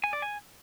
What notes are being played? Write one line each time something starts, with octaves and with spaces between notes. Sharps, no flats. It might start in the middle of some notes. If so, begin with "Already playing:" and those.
G#5
D5
G#5